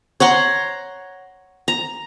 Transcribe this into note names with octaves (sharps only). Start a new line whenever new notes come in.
C#5 F#5 A#5 C6
A#5